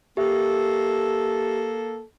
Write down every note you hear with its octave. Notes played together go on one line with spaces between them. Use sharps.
A#3 G4 A4 E5